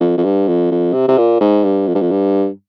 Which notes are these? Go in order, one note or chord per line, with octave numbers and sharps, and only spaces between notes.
F2
F2
G2
F2
F2
C3
C3
A#2
G#2
G2
F2
G2
F2
G2